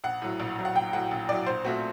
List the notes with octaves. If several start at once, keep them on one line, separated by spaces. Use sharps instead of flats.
A#1 F#5
A2 F#3
A#1
A2 F#3
F#5
A#1 G5
A2 F#3 F#5
A#1
A2 F#3 D5
A#1 C5
A#2 A3 C4 F#4